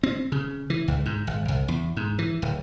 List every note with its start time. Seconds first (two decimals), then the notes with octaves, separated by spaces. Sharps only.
0.03 C4
0.32 C#3
0.70 E3
0.88 C#2
1.06 G#2
1.27 G#1
1.48 C2
1.68 E2
1.97 G#2
2.19 E3
2.42 D1